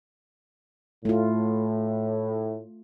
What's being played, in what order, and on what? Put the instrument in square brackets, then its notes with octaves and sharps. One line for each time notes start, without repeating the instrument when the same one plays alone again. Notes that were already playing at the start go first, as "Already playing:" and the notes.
[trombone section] A2 [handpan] A3 F4